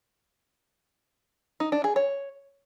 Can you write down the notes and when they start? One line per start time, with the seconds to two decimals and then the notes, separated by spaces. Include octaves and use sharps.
1.60 D#4
1.72 D4
1.84 G#4
1.96 C#5